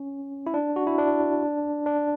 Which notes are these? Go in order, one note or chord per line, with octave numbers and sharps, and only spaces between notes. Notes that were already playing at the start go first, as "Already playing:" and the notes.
Already playing: C#4
E4
D4
F#4
E4
D4
D4